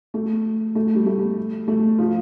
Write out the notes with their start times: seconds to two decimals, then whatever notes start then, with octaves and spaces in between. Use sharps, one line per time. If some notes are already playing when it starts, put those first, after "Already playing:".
0.14 A3
0.75 A3
0.95 G3
1.06 A3
1.68 A3
1.98 F3